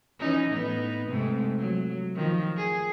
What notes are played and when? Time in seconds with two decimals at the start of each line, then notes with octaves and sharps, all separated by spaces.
0.20 E3 C#4 D#4
0.52 A2 B3 D#4
1.07 G#2 C3 A3
1.59 F#3
2.16 D#3 F3
2.57 G#4